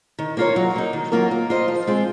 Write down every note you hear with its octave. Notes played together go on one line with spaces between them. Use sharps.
D#3
A#3 F4 A#4 C#5
F#3
A#3 D#4
D#3
F#3 A#3 F4 A#4
A#3
F4 C5 D#5
F3
G#3 C4 F4